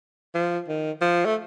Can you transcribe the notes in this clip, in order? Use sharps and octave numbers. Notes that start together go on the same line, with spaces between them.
F3
D#3
F3
A3